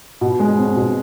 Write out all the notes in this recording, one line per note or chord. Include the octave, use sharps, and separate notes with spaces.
B2
G#3
C4
B2